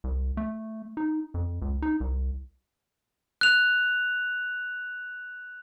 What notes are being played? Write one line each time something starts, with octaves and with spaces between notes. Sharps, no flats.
C2
A3
D#4
F2
C#2
D#4
C2
F#6 F7